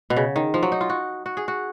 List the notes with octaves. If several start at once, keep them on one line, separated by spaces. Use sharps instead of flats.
B2
C#3
D#3
F3
F#3
D#4
F4
F#4
F#4
G#4
F#4